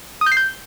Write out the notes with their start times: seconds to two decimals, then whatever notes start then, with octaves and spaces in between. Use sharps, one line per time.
0.21 D#6
0.26 G6
0.32 C7
0.37 G6